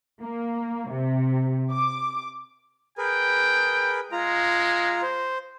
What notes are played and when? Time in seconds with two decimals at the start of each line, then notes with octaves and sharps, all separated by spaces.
0.21 A#3
0.90 C3
1.71 D6
2.98 G#4 A#4 B4 G5
4.12 G#3 F4 A#5
5.02 C5